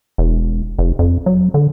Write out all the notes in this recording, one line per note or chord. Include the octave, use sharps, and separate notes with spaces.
E1
F1
F2
F#3
D3